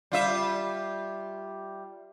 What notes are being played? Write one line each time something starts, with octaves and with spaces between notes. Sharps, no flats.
G3 F4 E5